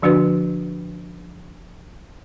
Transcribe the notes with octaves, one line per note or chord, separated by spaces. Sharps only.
D3 F3 D4 F#4 B4